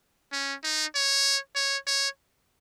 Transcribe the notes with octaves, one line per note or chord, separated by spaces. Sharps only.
C#4
D#4
C#5
C#5
C#5